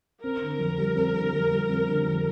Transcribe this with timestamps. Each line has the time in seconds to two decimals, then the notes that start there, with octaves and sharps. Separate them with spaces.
0.23 C4 A#4
0.42 D3
0.59 F2
0.78 G3
0.96 C4
1.15 D3
1.33 F2
1.51 G3
1.69 C4
1.87 D3
2.06 F2